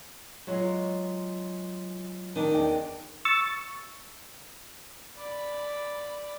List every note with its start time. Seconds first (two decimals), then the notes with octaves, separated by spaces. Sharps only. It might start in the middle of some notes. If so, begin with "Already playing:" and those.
0.47 F#3 G#3 F4
2.36 D#3 D4
2.53 E2 D5 G5
3.25 C#6 E6 A6
5.17 D5 B5